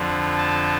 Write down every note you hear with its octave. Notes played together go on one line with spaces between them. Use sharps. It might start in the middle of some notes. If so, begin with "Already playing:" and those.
Already playing: F2 D3 F3
A5